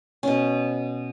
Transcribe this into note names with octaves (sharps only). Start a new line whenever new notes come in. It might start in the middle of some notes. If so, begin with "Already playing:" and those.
B2 C#4